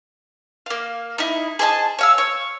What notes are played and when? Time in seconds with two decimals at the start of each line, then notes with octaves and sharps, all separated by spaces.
0.66 A#3 F5
1.18 D#4 E4
1.59 G#4 C5 D#5 A5
1.99 C#5 F5 E6
2.18 C#5